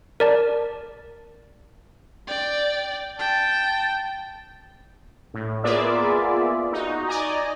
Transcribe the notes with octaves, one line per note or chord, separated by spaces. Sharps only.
A#4 D5 A5
D5 G5
G5 A5
A2
A#3 B3 F4 G#4 D5 E5
D#4 F#4
D5 D#5 G#5 A#5